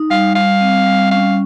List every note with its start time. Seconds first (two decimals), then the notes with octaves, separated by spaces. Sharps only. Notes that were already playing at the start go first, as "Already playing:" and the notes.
Already playing: D#4
0.10 G3 F5
0.36 G3 F5
0.61 C4
0.86 G3
1.11 C#4 F5